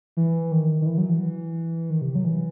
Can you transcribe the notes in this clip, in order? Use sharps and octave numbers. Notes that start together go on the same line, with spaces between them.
E3
D#3
D#3
E3
F#3
E3
D#3
C3
F#3
E3